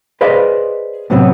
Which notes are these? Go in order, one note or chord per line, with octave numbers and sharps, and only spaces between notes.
G#4 B4 C5 D5 D#5 F5
A2 C3 F#3 B3 C4